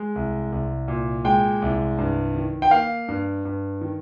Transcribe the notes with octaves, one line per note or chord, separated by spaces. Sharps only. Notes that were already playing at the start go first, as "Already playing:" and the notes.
Already playing: G#3
C2
C2
A#2
G#3 G5
C2
G2
D#3
G5
A#3 F5
G2
G2
D#3